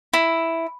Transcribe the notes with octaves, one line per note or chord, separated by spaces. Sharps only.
E4